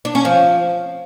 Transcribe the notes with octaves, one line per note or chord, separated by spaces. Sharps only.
D4
C#4
F3